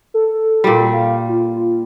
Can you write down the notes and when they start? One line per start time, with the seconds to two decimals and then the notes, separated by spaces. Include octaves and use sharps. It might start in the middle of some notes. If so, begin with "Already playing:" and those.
0.14 A4
0.64 A#2 G3
0.93 F5
1.29 F4